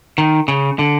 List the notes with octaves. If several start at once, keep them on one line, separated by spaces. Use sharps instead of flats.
D#3
C#3
D3